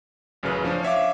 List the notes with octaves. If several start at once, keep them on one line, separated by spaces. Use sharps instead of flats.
A1 F#2 C#3 B4 F6
F3 C#4 D4 C5
C#5 E5 F5 D6